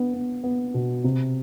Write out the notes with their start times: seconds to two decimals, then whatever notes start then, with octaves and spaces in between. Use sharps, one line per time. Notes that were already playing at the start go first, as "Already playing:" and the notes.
Already playing: B3 D4
0.14 B3
0.44 B3
0.74 B2
1.04 C3